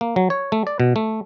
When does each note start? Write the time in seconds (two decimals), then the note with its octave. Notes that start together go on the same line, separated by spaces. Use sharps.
0.01 A#3
0.16 F#3
0.30 C#5
0.52 A3
0.67 D5
0.80 B2
0.96 A3